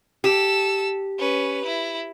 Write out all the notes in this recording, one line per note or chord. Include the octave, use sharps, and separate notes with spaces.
G4 A4 E6
C#4 B4
E4